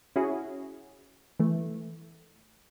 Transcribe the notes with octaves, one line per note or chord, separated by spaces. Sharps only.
C#4 E4 F#4 G#4
E3 A3